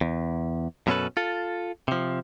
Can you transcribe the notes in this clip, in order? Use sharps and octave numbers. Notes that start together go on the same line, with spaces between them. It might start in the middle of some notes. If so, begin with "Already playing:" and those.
E2
F#2 B2 B3 C#4 A4 B4
F4 A4
C3 F3